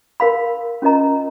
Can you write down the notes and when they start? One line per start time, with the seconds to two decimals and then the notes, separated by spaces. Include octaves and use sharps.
0.20 A#4 F5 B5
0.82 C#4 F4 A#4 D#5 A#5